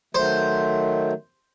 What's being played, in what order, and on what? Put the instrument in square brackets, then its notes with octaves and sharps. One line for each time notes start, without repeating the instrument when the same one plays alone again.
[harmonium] D#3 F#3 A3 [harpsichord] C5